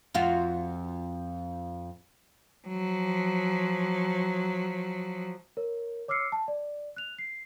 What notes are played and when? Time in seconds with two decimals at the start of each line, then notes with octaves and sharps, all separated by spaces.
0.14 F2 F4 F#4
2.68 F3 F#3
5.57 A#4 C#5
6.08 C#5 D6 E6 F6 C7 C#7
6.32 A5
6.48 D5
6.96 F#6 F7
7.19 C7